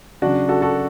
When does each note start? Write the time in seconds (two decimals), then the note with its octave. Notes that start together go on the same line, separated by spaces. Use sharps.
0.22 C#3 F#3 D4 F#4
0.49 F#4 A4
0.62 F#4 A4